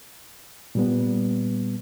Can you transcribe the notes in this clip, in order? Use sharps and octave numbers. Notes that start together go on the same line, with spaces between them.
A#2 G3 B3